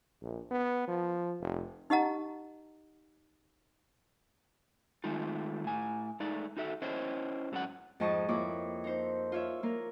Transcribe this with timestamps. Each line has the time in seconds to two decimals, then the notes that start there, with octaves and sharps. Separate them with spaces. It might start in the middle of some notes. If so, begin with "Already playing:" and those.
0.22 A#1
0.51 B3
0.88 F3
1.41 F1
1.90 D#4 G4 D#5 F#5 A#5
5.04 D#3 G#3 A3 D#4 F4
5.64 A2 G#5
6.20 G#3 A3 D#4 D5
6.57 D#4 F#4 A4 E5
6.82 C#4 E4 C5 C#5 D#5
7.52 G#2 F#3 C#4 A4 D5 F#5
8.00 F2 G#2 D#5 A5 C#6 D#6
8.28 F2 A#3 E4 C#5 D6
8.84 D#4 C5
9.32 F4 C#5 E5
9.63 A#3 F4 A#4